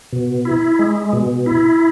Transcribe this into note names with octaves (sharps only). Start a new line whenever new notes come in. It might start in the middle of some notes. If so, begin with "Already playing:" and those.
B2
E4
G#3
B2
E4